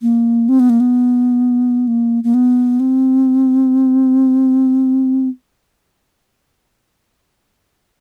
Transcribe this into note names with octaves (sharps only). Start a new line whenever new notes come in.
A#3
C4
B3
A#3
B3
A#3
A#3
B3
C4